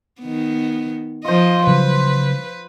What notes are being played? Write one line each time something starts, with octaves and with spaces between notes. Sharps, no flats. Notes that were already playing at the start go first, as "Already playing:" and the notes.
D#3 B3
F3 F4 C5 D#5
C#3 F#3 G3 B4